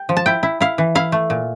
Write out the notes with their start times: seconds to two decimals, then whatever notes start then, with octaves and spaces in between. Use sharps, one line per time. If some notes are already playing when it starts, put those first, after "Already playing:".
Already playing: G5
0.09 F3
0.17 A5
0.26 E4 G5
0.43 E4
0.61 E4 F5
0.78 E3
0.95 E4 F5
1.12 A3
1.30 A#2